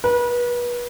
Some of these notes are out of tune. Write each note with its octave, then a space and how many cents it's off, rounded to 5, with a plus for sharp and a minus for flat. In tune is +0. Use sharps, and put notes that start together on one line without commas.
B4 -35